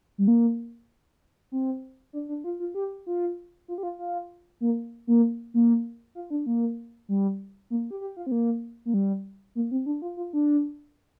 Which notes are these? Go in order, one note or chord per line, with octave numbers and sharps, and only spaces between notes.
G3
A#3
C4
D4
D4
F4
F4
G4
F4
F4
G4
F4
F4
A#3
A#3
A#3
F4
D4
A#3
G3
A#3
G4
G4
F4
C4
A#3
A#3
G3
A#3
C4
D4
F4
F4
D4